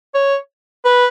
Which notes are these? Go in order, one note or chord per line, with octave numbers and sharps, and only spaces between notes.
C#5
B4